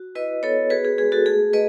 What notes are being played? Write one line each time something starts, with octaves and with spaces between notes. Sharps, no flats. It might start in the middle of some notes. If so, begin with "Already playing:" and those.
Already playing: F#4
E4 B4 D#5
B3 A4 C#5
F#4 G#4 B4
G#4
G#3 G#4
F#4 A4
A3 G#4
A3 B4 D#5